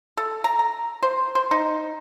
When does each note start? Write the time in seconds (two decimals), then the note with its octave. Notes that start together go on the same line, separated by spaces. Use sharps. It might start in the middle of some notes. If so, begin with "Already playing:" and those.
0.17 A4
0.44 A#5
0.59 A#5
1.03 C5
1.35 C5
1.51 D#4